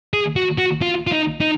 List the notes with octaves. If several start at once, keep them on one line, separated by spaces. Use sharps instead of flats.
G#4
F#4
F#4
F4
F4
D#4
D#4